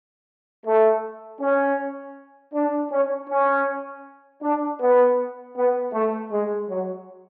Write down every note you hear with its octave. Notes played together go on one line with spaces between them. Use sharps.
A3
C#4
D4
C#4
C#4
D4
B3
B3
A3
G#3
F#3